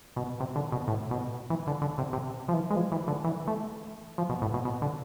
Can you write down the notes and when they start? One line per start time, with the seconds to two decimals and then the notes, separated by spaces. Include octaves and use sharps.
0.16 B2
0.40 C3
0.56 D3
0.72 B2
0.88 A2
1.11 B2
1.50 E3
1.67 D3
1.82 D3
1.98 C3
2.13 C3
2.48 F3
2.53 E3
2.70 G#3
2.76 F3
2.92 E3
3.08 D3
3.24 E3
3.47 A3
4.18 F3
4.29 B2
4.42 A2
4.54 B2
4.65 B2
4.82 D3